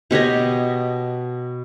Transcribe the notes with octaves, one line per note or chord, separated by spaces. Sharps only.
B2 G4 C#5 D#5